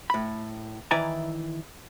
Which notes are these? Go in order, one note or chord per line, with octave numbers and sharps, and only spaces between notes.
A2 B5
D#3 E3 E4 D5 G#5 A#5